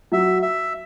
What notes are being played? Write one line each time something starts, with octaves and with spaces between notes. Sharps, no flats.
F#3 E5
E5